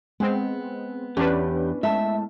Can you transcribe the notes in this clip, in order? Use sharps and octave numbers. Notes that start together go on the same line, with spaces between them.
G#3 B3 C4
E2 C#4 D4 G4 B4
A2 G#3 E5 A5